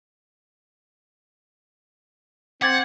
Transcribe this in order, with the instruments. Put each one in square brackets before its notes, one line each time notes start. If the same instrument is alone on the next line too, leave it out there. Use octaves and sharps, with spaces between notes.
[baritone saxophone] C4 [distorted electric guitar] F#5 [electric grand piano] D6 G#6 A6